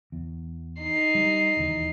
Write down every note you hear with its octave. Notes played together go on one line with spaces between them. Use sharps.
E2
D#4 C7
G3
E1 D#2 E3